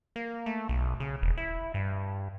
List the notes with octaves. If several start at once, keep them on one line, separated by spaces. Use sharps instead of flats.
A#3
A3
B1
C#3
E1
E4
G2